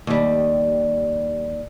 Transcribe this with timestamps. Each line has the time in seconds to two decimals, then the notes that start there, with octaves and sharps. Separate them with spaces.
0.07 D#2 G3